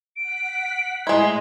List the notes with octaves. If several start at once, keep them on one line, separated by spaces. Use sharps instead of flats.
F#5 B6 D7
A2 G#3 E4 D#5 C6